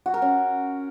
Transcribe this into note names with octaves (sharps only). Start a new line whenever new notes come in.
F#4
A#4
C#4